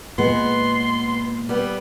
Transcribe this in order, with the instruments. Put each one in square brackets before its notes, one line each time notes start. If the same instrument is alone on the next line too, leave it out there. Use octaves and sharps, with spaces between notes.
[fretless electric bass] A#2 G#3 [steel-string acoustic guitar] B3 [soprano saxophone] C6
[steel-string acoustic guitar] G3 B3